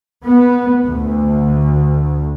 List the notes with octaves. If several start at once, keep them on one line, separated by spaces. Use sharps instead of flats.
B3
D2